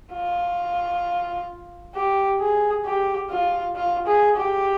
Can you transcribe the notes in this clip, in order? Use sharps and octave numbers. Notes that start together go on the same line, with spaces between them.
F4
G4
G#4
G4
F4
F4
G#4
G4